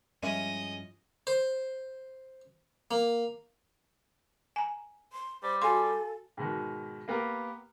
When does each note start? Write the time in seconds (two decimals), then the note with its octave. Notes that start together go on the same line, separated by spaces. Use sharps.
0.23 G2 F3 G3 G#3 C#4 E4 D#5 E5
1.27 C5
2.91 A#3
4.56 G#5 A#5
5.13 C6
5.43 G3 C5
5.62 F#4 A4 F5 G#5 C6
6.37 G#2 B2 D#3
7.08 A#3 B3 G4 A#4